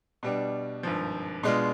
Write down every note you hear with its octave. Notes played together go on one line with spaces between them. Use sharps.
B2 G3 D4
G#1 G2 F3
B2 G#3 D4 F4